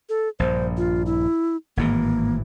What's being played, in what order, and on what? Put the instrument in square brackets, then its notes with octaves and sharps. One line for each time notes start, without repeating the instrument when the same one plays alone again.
[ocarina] A4
[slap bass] A#1 G2 [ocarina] C5
[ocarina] F4
E4
[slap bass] G#1 A2 E3 [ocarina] A#3